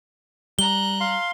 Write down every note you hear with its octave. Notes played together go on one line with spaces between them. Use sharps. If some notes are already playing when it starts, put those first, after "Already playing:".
G3 A#5 F#6 G7
F5 C6